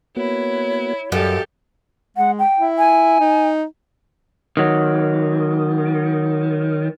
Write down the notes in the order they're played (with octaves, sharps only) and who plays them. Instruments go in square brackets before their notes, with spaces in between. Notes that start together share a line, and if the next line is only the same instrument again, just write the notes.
[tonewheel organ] A#3 B3 F#4 [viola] E4 [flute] C#5
[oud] F#2 [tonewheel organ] F#4 D#5 F5 [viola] G4 A4
[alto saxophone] G#3 [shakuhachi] F#5
[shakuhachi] G5
[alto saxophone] E4
[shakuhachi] G#5
[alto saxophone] D#4
[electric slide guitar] D#3 F#3